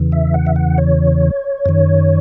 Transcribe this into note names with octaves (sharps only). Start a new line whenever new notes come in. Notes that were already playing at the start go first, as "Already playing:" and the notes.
Already playing: E2 C#3 E3
E5
F#5
E5
F#5
C#5
F#2 D#3